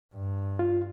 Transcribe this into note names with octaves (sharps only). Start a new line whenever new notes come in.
G2
F4